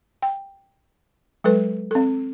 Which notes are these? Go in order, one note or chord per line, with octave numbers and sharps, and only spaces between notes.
G5
F#3 G#3 A4 B4
C4 A4